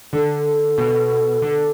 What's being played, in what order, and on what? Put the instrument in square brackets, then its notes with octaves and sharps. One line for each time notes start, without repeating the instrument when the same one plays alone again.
[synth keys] D3 [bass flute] A4
[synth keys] B2
D3